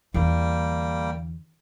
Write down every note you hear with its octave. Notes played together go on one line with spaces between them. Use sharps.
E2 D3 G3 A#3 G5